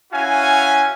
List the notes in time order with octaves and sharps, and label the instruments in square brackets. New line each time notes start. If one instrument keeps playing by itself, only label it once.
[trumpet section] C#4 E4 F#4 F5 G#5